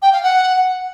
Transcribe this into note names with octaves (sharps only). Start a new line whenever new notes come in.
G5
F5
F#5